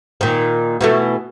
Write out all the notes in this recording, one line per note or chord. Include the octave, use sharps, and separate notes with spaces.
A#2 D#3
B2 E3 A3